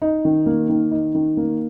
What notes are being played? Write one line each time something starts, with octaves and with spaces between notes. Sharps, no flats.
D#4
D#3
A#3
D#3
D#4
D#3
A#3